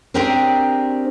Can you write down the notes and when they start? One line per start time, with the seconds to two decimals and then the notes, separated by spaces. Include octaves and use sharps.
0.14 C4 D4 G4 G#4 A#4 C5